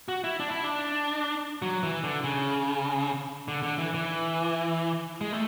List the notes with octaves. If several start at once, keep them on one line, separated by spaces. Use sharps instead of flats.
F#4
E4
D4
E4
D4
F#3
E3
D3
C#3
D3
D3
E3
E3
G#3
A3